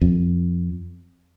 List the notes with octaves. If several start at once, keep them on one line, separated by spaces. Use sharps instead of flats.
F2